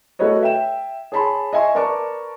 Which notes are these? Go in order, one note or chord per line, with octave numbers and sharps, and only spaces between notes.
A3 F#4 A4 B4 C#5 D#5
E5 G5 E7
G#4 C#5 A5 B5 C6
D#5 E5 G#5 C6 C#6
A#4 B4 D5 A5 C#6 D6